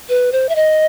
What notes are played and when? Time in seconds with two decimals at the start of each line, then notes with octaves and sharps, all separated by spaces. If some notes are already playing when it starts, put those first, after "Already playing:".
0.09 B4
0.32 C5
0.49 E5
0.56 D#5